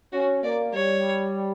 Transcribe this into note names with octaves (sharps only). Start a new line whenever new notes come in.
C#4 F#4
A#3 D5
G3 C#5